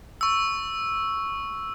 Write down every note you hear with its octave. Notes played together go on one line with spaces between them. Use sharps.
C#6 E6